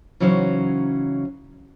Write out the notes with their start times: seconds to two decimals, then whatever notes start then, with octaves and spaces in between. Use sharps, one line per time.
0.20 C#3 E3 F#3 C#4 D#4 C5